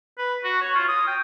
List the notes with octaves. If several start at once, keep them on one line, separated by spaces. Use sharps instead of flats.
B4
F#4
C#5
F4
D#6
G5